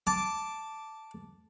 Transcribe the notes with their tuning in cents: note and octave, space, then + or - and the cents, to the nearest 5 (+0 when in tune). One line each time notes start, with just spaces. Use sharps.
A5 +0 D6 -5